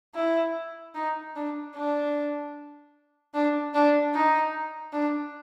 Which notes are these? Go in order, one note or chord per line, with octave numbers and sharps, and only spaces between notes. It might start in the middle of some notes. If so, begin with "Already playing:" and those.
E4
D#4
D4
D4
D4
D4
D#4
D4